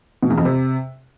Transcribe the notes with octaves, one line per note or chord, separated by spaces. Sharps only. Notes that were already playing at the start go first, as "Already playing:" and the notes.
B2
E2
F2
C3